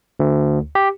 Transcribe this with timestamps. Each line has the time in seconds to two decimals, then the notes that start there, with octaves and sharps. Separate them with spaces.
0.20 D2
0.75 G4